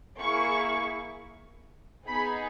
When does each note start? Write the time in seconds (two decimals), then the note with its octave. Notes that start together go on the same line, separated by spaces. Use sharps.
0.18 A#3 E4 G#4 C#6
2.07 B3 D#4 G#4 B5